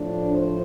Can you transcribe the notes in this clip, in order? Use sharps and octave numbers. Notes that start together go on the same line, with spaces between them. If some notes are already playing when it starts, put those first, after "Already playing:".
Already playing: A2 F3 A3 D4
C5